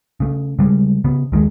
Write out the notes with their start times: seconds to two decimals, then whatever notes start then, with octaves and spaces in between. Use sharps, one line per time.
0.20 C#3 A3
0.59 C#3 G3 G#3
1.04 C#3 B3
1.32 D#2 D#3 F3 G#3